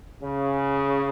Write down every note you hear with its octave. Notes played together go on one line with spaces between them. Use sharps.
C#3